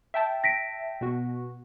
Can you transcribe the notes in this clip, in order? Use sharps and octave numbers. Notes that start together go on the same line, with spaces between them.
E5 G5 A5
A#6 B6 D7
B2 F#4